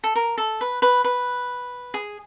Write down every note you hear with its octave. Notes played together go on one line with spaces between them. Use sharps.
A4
A#4
A4
B4
B4
B4
G#4